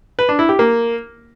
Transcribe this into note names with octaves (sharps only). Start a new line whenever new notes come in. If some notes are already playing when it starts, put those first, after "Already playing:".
B4
D4
E4
G4
A#3